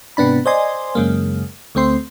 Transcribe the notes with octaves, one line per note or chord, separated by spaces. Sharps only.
G#2 C3 B3 D4 B5
C5 D5 D#5 G#5 C6
F#2 C#3 G#3 A#3
D2 A3 C4 C6